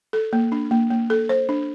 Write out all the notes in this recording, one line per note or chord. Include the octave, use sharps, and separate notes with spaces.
A4
A#3
D4
A#3
A#3
A4
C5
D4